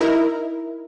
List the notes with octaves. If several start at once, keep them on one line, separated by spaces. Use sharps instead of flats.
D#4 E4 A#4